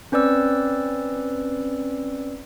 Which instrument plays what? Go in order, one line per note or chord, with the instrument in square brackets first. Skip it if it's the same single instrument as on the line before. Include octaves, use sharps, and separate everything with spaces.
[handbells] C4 C#4 B4 D5 E6